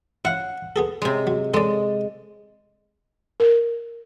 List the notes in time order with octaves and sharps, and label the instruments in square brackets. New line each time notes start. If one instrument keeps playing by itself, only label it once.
[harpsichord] E4 F5 [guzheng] F#5
[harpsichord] B3 G#4 A4
[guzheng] C3 G#3
[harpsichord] F#3
[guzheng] G#3 [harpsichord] A4 D5
[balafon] A#4